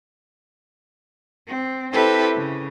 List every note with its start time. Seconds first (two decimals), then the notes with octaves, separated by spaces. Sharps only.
1.46 C4
1.92 C4 E4 G4 A4 B4 C5
2.36 C#3